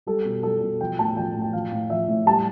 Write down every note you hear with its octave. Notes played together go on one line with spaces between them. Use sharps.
G3 A4
B2
G3 A4
B2
F3 G5
A2 A5
F3 G5
A2
G5
F3 F5
A2
F3 E5
A2
G3 A5